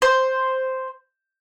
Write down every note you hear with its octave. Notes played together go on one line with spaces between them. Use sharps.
C5